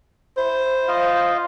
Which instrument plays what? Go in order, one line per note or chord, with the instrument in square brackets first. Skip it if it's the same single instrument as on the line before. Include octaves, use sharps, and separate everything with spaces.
[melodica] E4 [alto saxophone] C5
[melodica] F4 D#5 F5